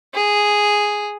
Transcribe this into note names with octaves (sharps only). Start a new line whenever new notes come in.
G#4